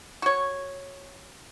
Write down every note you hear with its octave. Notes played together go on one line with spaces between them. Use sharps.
F#4 C#5